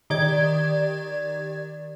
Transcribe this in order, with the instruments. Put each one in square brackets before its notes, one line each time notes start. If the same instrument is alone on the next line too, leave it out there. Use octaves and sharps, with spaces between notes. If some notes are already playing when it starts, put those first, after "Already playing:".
[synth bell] D#3 G4 D5 G#6